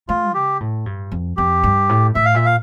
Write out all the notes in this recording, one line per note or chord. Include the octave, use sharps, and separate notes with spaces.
A3 F4
C#3 G4
A2
G2
F2
F2 G4
G2
A2
A2 E5
F5
A#2 E5
F5